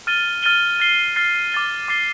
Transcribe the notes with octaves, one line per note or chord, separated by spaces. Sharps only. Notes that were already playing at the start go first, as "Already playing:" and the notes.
F6 A6 D#7 G7
F6 A6 D#7 G7
F6 A6 C7 G7
F6 A6 C7 G7
D6 F6 A6 C7 G7
D6 F6 A6 C7 G7